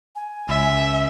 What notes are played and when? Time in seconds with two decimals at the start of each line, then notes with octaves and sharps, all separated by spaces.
0.16 G#5
0.49 C#2 E5